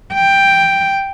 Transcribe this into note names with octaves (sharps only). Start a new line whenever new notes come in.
G5